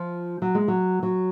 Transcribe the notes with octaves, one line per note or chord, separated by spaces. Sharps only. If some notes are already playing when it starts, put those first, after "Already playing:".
Already playing: F3
F#3
G#3
F#3
F#3